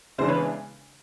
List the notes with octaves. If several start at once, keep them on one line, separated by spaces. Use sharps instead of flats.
C#3 E3 G#3 B3 D4 C5
B4 C#5